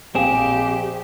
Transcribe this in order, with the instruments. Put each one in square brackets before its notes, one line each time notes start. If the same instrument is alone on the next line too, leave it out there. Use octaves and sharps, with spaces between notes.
[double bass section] A#1 [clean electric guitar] C4 G#4 [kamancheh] G4 [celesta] F5 E7